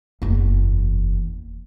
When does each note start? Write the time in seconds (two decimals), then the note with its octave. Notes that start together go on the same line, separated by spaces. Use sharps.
0.22 F#1 E2